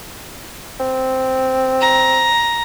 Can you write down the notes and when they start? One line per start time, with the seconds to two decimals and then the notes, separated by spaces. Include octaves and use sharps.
0.80 C4
1.81 A#5